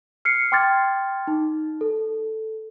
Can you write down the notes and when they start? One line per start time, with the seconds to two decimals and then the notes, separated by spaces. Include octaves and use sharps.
0.25 F6 C7 C#7
0.52 G5 C6 D6 F6 G#6 A6
1.27 D#4
1.81 A4